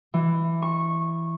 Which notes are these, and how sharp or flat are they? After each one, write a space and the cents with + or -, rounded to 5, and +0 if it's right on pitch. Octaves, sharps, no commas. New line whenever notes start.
E3 +10
C#6 -15